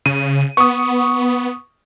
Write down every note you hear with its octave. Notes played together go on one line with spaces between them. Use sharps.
C#3 D#7
B3 C#6 D#6